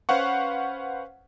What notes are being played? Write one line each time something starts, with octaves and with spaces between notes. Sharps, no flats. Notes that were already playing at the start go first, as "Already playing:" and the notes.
C#4 B4 C5 F5 F#5 C#6